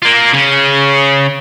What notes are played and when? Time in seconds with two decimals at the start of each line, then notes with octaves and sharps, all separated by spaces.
0.02 A#3 F4
0.33 C#3 C#4